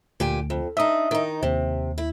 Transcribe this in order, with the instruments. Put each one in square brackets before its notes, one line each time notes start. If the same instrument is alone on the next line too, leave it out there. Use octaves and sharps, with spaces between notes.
[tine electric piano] D2 [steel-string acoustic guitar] A#2 G4 G#5
[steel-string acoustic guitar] F2
[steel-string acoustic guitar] D4 D#4 [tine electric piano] E5 D#6
[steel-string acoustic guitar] D#3 D#4
[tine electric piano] D#2 [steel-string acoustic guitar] C3
[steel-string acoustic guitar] E4